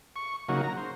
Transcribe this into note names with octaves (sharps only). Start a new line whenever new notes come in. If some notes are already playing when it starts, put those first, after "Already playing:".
C#6
C#3 F#3 A#3 D#4 F#4
A#5
C5